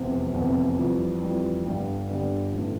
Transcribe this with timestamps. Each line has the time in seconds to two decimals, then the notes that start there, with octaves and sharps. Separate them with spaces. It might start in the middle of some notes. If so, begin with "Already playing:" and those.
Already playing: F1 E2 C3
0.34 F1 E2 C3
0.77 F2 E3 G3
1.21 F2 E3 G3
1.65 G1 G2 D3 G3
2.08 G1 G2 D3 G3
2.51 A1 A2 E3 A3